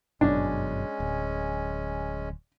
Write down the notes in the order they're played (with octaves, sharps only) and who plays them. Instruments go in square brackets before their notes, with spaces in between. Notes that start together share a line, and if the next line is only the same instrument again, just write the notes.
[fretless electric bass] G1 F#2 B2 [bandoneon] G#3 C#4 [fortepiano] D4
[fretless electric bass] D1